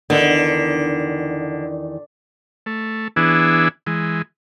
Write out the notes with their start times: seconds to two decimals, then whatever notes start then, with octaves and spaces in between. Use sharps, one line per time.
0.10 E2 D3 D#3
2.66 A3
3.16 E3 B3 D4 E4 G#4
3.87 E3 G#3